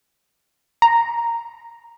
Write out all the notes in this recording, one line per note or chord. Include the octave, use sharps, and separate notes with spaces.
A#5